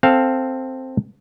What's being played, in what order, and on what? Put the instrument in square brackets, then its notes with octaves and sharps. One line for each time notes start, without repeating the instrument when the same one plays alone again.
[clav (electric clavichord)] C4 A4 F5